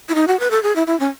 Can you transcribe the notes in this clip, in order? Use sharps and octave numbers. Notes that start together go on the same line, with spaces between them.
E4
D#4
F#4
B4
A4
G#4
E4
E4
C#4